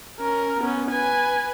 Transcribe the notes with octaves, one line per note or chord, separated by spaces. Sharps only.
C#4 A#4
B3 C#4
B4 G#5